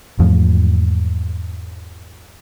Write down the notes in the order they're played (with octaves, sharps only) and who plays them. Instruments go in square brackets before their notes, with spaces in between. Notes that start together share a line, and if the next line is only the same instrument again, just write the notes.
[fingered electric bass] E2 G#2 F3 A3